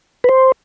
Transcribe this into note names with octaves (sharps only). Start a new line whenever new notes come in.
B4
C5